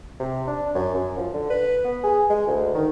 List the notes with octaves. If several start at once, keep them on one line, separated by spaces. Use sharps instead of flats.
C3
D4
F#2
F#2
F3
D3
B4
B3
G#4
G#3
D2
D#3